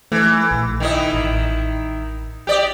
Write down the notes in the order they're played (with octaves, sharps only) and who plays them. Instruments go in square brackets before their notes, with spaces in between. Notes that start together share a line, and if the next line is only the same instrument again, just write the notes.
[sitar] E3 [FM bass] A3
[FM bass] A#1
[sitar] D#3 E4 D#5
[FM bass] A1
[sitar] G4 D5 D#5